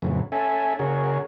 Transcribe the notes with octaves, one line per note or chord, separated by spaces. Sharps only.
F2 A2 C#3 E3 F#3
C#4 A4 E5 G#5
C#3 F#4 G#4 A#4 C#5